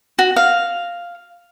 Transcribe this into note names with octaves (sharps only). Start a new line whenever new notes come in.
F#4
F5